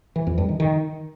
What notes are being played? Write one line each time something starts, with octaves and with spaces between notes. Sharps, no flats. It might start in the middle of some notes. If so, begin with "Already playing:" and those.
E3
F2
G2
D#3
D#3